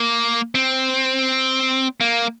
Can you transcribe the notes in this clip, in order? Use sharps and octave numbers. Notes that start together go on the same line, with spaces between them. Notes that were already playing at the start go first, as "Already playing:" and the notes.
Already playing: A#3
C4
A#3